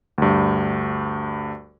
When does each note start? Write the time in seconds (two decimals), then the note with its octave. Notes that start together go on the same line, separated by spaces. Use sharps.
0.18 D2 G2